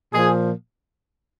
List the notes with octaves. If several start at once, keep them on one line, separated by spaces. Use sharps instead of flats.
A#2 F3 G#4